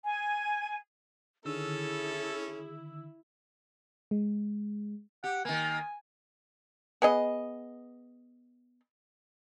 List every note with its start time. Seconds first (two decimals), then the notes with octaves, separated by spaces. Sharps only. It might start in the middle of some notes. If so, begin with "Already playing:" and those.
0.04 G#5
1.45 D3 D#3 C#4 E4 G#4 A4 E6
4.11 G#3
5.24 G4 F#5
5.45 D#3 A#3 G#5
7.02 B3 G#4 D#5